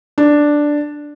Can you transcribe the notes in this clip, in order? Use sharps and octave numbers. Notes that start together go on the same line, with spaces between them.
D4